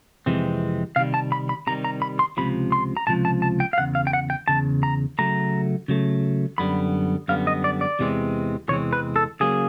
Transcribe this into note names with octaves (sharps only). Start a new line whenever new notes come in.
F2 C3 E3 G#3 C4
C3 D#3 G3 F5
A5
B5
B5
C3 D#3 G3 A#5
A#5
B5
C6
C#2 C3 F3 B5
C6
A#5
C#2 C3 F3 A5
A5
A5
G5
F5
E2 C#3 F#5
F5
G5
F#5
G5
E2 C#3 A5
A#5
C#3 F#3 A3 A#5
C#3 F#3 A3
F#2 D3 G3 B3 B5
F#2 D3 G3 B3 F5
D#5
D5
D5
E2 C3 E3 G#3 C4
E2 C3 E3 G#3 C4 C#5
B4
A4
C#3 F#3 A#3 G#4